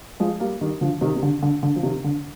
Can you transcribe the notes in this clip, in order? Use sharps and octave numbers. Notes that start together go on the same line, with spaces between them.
F3 G#3
G3 A#3
D#3 G3
D3 F3
C3 D#3
C3
D3
D3
D3
F3
C3 D#3
D3